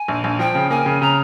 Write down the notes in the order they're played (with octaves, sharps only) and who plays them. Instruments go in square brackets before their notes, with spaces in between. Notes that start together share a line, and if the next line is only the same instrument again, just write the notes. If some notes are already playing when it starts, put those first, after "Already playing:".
Already playing: [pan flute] G#5
[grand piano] A#1
A#1
[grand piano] F3 [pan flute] G5
[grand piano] C#3
[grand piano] A#3 [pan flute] G#5
[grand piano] C#3
[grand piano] C#3 [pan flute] A#5